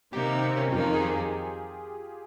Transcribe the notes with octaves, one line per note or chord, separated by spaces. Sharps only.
C3 D#3 A#3 D#4 G4
C4
C#4
F2 D#3 A#3 D#4 F4
G#4
G4